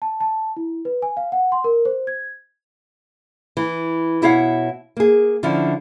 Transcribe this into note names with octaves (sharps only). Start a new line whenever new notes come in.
A5
A5
E4
B4
G#5
F5
F#5
C6
A#4
C5
G#6
E3
B2 E4 C#5 F5 F#5
A#3 G#4
D3 F3 C#4 D4 E4